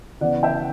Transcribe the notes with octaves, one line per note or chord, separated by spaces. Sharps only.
C#3 E3 B3 D5 F#5
E5 G5